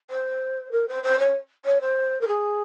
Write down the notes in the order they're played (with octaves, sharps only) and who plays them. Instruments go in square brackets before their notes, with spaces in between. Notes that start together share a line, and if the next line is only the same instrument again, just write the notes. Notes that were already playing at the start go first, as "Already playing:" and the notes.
[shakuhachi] C5
A#4
C5
C5
C#5
C#5
C5
A#4
G#4